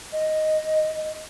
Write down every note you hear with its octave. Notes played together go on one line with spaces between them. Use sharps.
D#5